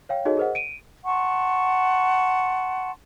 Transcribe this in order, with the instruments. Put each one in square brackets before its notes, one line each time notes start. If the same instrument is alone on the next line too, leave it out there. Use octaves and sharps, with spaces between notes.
[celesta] C#5 F5 G5
D#4 F#4 G#4 A4 C#5 D#5
G#4 A#4 C5 D#5 F#5
D7 D#7
[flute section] F#5 A5 C6 C#6